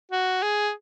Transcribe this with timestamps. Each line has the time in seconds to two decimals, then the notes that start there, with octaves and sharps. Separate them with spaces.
0.12 F#4
0.43 G#4